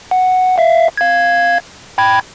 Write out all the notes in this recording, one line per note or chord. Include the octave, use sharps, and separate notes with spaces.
F#5
E5 F5
F5 G#6
G5 B5 G#6